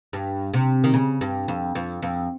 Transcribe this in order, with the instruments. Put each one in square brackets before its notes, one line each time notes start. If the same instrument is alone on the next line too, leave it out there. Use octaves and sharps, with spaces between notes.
[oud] G2
C3
D#3
C#3
G2
F2
F2
F2